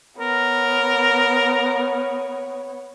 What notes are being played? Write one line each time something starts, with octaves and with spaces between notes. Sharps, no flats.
B3 A#4 C#5